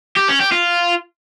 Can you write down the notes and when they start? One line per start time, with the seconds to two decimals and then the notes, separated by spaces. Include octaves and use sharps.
0.16 G4
0.28 C#4
0.40 G4
0.52 F4